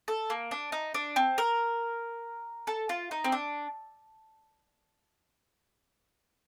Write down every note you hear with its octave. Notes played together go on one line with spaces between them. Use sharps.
A4
A#3
D4
D#4
D4
C4
A#4
A4
F4
D#4
C4
D4